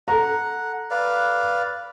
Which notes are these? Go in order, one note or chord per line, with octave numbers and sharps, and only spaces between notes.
A4 F#5 A#5
B4 D5 F5